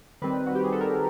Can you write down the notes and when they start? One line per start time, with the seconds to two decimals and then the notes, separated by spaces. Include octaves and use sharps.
0.22 D#3 G3 C4 B4
0.46 F#4
0.55 G4
0.64 G#4
0.73 A4
0.81 A#4